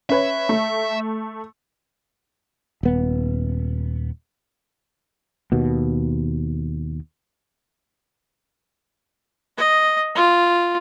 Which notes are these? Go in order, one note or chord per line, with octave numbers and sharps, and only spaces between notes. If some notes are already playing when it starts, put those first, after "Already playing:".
C#4 B4 C#5 E5
A3
D#1 B3
D#2 B2
D#5
F4